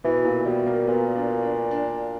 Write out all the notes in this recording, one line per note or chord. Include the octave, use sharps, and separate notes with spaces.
B2 E3
A#2
B2 G3
A#3
A#2 B3
D4
D4
D4